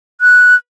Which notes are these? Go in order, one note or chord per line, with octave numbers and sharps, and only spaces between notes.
F#6